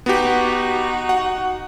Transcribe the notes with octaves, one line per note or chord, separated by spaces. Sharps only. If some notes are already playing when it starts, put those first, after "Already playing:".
B3 D#4 F#4 G4
F#5